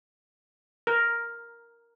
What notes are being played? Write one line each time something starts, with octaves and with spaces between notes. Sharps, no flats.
A#4